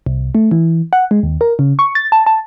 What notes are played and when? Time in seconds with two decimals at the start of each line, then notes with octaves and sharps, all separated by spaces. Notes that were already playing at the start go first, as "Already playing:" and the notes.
0.06 C2
0.35 A3
0.51 E3
0.93 F#5
1.11 G#3
1.23 D#2
1.41 A#4
1.59 C#3
1.79 C#6
1.95 A6
2.12 A5
2.26 A5